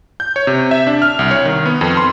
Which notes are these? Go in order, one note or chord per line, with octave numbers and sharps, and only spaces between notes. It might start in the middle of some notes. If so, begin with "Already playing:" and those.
G6
C#5
C3
E5
D4
F6
C2
C#5
D#3
B3
F2
C6